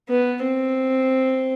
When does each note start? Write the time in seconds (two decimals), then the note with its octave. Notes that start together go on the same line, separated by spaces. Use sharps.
0.09 B3
0.43 C4